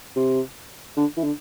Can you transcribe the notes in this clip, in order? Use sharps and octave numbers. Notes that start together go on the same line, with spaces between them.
C3
D3
E3
D3